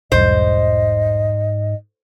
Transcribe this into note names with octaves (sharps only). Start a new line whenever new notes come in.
B1 E2 G#2 G3 C5 D#5